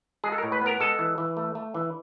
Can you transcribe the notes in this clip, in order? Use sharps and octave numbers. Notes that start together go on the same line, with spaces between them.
G#3 G#4
A4
A#4
A2
B4
B3 A#4
G#3 A4
E3
E3
A3
A3
E3